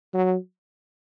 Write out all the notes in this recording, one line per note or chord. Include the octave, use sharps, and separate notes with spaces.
F#3